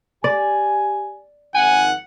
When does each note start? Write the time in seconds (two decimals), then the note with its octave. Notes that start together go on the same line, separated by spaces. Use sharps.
0.24 G4 D5 G#5
1.55 G#1 D#3 F3 F#5 G#5